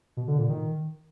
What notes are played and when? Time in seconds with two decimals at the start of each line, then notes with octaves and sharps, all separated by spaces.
0.17 B2
0.28 D3
0.39 A#2
0.49 D#3